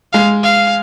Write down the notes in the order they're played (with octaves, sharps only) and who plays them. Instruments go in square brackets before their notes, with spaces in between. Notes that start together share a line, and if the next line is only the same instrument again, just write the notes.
[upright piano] G#3 [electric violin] F5
[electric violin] F5